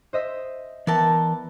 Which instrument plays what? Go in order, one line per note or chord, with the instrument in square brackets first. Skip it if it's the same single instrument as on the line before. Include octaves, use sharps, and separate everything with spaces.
[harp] C5 D#5 E5
[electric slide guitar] E3 A#4 G5 [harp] B3 [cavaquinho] D5 E5 A5